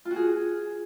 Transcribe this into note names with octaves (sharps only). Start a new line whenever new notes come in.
F4
F#4
G#4